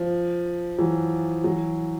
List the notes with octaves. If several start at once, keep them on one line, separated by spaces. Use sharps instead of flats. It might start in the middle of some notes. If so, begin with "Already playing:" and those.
Already playing: F3
E3 F#3
E3 F#3